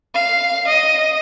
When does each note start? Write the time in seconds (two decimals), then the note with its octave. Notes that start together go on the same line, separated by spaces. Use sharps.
0.15 F5
0.67 D#5